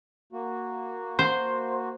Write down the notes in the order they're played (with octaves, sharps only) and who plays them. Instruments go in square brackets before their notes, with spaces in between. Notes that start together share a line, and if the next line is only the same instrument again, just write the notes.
[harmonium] A#3 F#4
[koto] C5